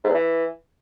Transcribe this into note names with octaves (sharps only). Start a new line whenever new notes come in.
G#2
E2
E3